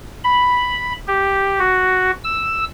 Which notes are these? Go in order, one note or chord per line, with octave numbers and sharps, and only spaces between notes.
B5
G4
F#4
E6